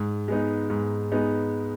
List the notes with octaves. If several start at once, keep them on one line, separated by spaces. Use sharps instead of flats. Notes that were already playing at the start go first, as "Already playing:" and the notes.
Already playing: G#2
G#3 B3 D#4
G#2
G#3 B3 D#4